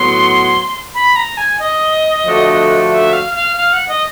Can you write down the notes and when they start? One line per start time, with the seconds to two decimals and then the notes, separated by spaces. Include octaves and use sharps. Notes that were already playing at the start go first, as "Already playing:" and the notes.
Already playing: A2 F#3 B3 C6
0.94 B5
1.16 A#5
1.37 G#5
1.60 D#5
2.25 D3 F3 A3 D4 F#4
2.91 E5
3.13 F5
3.34 F5
3.56 F5
3.73 F#5
3.89 D#5